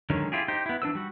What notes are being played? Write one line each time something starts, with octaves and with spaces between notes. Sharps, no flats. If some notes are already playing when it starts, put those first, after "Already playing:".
D3 D#3 F#3 G#3 C#4
E4 F4 G4 G#4
D#4 G4 C5
B3 E4
E3 D4 B4 E6
G3 F#4